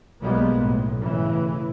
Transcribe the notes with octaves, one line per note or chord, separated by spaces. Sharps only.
B1 G3 G#3 A#3 B3
B1 A2
A2 C#3 E3